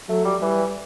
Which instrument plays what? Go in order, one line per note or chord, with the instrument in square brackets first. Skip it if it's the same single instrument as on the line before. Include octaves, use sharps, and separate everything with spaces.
[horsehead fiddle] F#3 [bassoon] A3
[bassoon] G3
[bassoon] E3 [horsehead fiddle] G3